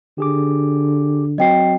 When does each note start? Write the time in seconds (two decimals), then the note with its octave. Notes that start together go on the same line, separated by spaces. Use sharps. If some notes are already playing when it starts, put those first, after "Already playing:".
0.18 D3 G4 G#4 D6
1.38 F#3 C4 F#4 D#5 G5 C7